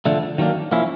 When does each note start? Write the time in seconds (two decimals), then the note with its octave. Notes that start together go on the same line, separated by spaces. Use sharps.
0.05 D3 F3 A3 D4
0.38 D#3 F#3 A#3 D4
0.72 F3 A#3 C#4 E4